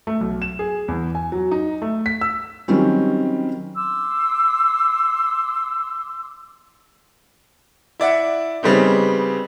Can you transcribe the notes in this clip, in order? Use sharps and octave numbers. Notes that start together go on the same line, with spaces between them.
A3
B1
E7
G#4
E2
G#5
F#3
D#4
A3
B6
E6
D#3 F#3 G3 C4 C#4
C6 D6 E6
E4 D5 E5 F#5
C#3 G3 B3 C4 D#4